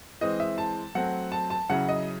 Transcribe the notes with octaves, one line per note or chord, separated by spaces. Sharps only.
E3 G#3 C4 D#5
E5
A5
F#3 A3 C4 F#5
A5
A5
C#3 F#3 C#4 E4 F#5
D#5